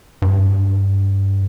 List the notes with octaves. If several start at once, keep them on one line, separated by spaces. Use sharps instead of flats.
G2